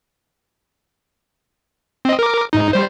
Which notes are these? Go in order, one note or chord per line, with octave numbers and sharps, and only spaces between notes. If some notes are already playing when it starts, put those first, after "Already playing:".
C4 D#5
A#4 D6
G#2 D#4
G3 C5